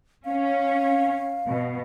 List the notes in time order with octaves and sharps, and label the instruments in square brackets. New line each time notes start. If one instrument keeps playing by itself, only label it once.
[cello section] C#4 [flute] F5
[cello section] B2